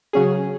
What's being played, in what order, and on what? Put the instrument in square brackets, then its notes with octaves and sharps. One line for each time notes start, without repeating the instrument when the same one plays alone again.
[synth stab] C#3 F#3 C#4 G#4